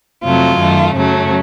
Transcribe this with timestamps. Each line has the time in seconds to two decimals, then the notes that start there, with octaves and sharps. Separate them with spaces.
0.24 F2 C3 F#3 A3 F4
0.59 F#2 D#3 A3
0.95 F#2 C#3 F#3 A3 C#4